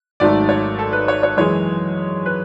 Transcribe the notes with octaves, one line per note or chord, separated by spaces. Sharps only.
G#1 G#2 F#3 A3 D5
C#5
A4
B4
C#5
C#5
F#2 E3 G#3 C#5
B4